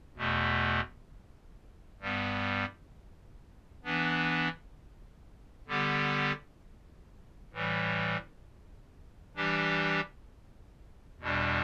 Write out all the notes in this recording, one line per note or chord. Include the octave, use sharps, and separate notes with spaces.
E2 B2 A3
G2 G3 B3
E3 B3 D4
D3 G3 B3 G4
A2 E3 G3
E3 G3 D4 G4
E2 B2 G3 D4